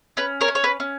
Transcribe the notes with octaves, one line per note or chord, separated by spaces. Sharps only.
C#4 B4
A#4 C#5
C#4
C#5
B4
C#4